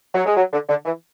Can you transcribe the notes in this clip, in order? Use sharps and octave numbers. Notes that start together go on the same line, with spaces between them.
F#3
G#3
F#3
D3
D3
E3